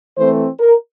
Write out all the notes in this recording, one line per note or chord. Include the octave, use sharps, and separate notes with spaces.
E3 A3 C4 C5
A#4